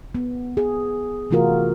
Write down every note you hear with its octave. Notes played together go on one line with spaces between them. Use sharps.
B3
G#4
C3 E3 A3 F4 F#4 A#4